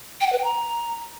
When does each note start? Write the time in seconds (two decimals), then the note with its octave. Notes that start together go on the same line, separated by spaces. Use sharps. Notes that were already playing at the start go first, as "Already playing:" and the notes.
0.21 G5
0.27 F#5
0.32 B4
0.38 G5
0.44 A#5